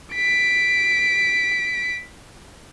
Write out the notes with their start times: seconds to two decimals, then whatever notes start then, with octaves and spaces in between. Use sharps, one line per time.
0.14 B6 D7